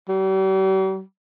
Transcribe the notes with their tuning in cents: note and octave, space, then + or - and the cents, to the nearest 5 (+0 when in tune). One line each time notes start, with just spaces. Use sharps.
G3 -45